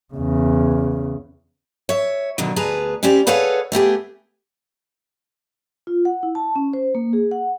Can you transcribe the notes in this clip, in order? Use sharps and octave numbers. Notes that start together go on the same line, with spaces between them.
E2 C#3
C#5 E5
B2 D3 D#3 F3 F#3
D2 G#4 B4 A5 A#5
C#4 E4 G4 C5 D5
G#4 A4 B4 C#5 F5 F#5
A3 B3 G4 G#4
F4
F#5
E4
A5
C#4
C5
A#3
G#4
F#5